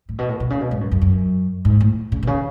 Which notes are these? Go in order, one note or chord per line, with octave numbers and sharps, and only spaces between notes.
A2
B2
A2
B2
C#3
B2
G#2
F#2
F#2
F#2
G#2
A2
C#3
B2
C#3